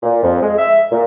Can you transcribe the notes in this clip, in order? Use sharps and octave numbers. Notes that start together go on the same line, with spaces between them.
A#2
F2
G#3
E5
A#2